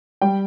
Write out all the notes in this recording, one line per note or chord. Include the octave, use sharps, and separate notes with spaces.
G3 G5